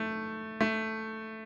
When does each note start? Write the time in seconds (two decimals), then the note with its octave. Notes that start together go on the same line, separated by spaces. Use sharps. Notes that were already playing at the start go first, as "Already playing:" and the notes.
Already playing: A3
0.61 A3